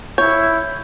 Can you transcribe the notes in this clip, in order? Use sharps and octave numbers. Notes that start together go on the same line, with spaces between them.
E4 C#5 G6